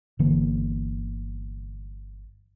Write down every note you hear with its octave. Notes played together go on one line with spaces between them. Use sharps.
G1 D3 E3 A#3